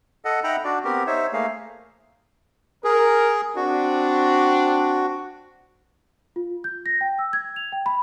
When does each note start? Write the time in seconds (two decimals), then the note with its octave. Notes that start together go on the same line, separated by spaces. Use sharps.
0.25 A4 D#5 F#5
0.44 D#4 E5 F#5 G5 A#5 B5
0.64 D4 F#4 D5
0.84 B3 C4 G4 A#4
1.07 D#4 C5 C#5 E5
1.33 A3 A#3 G#4 F5
2.84 G#4 A#4
3.56 C4 D4 F#4
6.36 F4
6.64 G6
6.86 A#6
7.01 G5
7.19 E6
7.33 G#6
7.56 F7
7.72 G5
7.86 B5